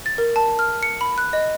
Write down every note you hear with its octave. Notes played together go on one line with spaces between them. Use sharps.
A6
A#4
A5
F6
C#7
B5
F#6
D#5